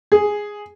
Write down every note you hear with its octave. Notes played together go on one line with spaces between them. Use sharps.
G#4